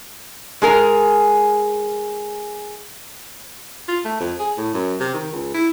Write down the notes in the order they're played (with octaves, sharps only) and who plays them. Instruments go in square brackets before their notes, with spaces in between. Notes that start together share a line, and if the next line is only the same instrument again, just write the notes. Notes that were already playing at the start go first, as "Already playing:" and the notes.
[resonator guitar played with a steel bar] G#3 G#4 A#4
[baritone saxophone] F4
A3
F2
G#4
A2
F#2
C3
D#3
C#2
E4